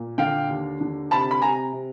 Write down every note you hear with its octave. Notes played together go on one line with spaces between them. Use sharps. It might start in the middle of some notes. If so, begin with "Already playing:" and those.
Already playing: A#2
D3 F5 G5
D#2
D3
C3 A5 B5
B5
C3 G#5 A#5
C3